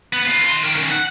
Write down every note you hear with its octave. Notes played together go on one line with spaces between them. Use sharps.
B3
F4 B4
D#3 C6
A#4 G5
D#3 C#4
F#5